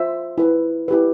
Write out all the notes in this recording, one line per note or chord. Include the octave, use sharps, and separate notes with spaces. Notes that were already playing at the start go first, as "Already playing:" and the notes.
Already playing: F4 C5 E5
E4 B4
E4 G4 B4